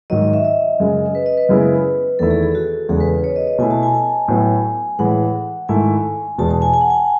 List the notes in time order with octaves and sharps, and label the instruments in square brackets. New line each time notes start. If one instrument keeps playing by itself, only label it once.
[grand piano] G#2 D#3 F#3 [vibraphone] D#5
[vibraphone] D#5
E5
D#5
[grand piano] F#2 C#3 G#3
[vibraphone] B4
D#5
B4
[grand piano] F#2 C#3 G#3 B3 E4
[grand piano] E2 D#3 A3 E4 [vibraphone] A4
[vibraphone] G#4
G#4
F#4
[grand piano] E2 C#3 G#3 [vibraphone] G#4
[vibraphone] B4
C#5
D#5
D#5
[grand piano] B2 A3 E4 [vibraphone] G#5
[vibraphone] A5
G#5
G#5
[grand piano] A2 F#3 B3 E4
[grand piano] A2 E3 G#3 [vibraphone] F#5
[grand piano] G#2 D#3 A3 E4 [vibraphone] G#5
[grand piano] E2 B2 G#3 [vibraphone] A5
[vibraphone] A5
G#5
G#5
F#5
G#5